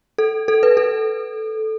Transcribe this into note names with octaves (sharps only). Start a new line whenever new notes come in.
A4
A4
B4
A4